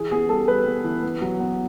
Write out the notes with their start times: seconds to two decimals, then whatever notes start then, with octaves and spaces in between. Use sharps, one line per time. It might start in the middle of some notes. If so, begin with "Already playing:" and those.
Already playing: E3 G#4
0.11 B3 G#4
0.29 G3 A4
0.47 G3 B4
0.67 B3
0.84 E3
1.03 B3
1.22 F#3
1.40 B3